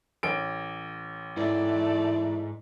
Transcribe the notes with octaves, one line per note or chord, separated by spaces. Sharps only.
A1 D7
G#2 E3 A3 D5